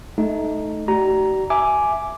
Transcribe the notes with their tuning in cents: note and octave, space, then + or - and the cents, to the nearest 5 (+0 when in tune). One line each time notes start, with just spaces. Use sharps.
A3 -15 D#4 +0
G4 -45 D5 +0 A#5 +5
E5 +0 G#5 +10 D6 +0